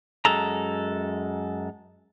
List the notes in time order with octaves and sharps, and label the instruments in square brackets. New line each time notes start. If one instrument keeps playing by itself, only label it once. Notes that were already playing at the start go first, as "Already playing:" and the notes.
[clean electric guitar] F#2 G#3 A4 A#5